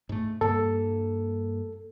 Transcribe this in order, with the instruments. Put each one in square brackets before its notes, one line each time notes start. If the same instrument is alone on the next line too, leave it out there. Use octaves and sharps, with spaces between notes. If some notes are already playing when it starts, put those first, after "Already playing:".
[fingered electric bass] G#2 A3
[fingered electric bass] G2 A#3 [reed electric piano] A4